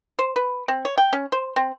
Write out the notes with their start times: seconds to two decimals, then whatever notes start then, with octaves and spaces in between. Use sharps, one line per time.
0.19 C5
0.36 B4
0.68 C4
0.85 C#5
0.98 G5
1.13 C#4
1.32 C5
1.56 C4